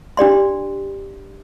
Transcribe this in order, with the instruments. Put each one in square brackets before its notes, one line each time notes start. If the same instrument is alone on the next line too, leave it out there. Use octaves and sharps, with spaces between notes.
[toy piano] D4 G4 D5 C6